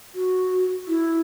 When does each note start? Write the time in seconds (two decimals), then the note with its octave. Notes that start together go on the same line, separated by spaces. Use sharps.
0.15 F#4
0.88 E4